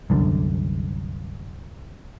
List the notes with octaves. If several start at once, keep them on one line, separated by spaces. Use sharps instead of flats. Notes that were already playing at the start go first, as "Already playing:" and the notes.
C2 F#2 D3